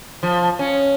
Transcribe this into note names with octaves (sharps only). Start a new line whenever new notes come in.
F3
C#4